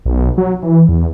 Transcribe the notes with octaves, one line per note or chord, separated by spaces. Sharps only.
B1
F#3
E3
E2